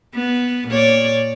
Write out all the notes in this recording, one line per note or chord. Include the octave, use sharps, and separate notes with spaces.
B3
A#2 C#5 D5